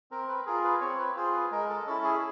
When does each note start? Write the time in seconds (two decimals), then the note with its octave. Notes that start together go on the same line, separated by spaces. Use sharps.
0.11 C4 A#4
0.29 B4
0.46 F4 G#4 A#4
0.64 B4
0.81 C4 C#5
0.99 B4
1.16 F4 G#4 C5
1.34 B4
1.51 G#3 A#4
1.69 A4
1.87 C#4 E4 A4
2.04 G#4